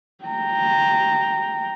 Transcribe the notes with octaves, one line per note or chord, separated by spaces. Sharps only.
G5 A#5